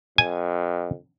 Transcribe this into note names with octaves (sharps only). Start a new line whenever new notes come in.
F2 G#5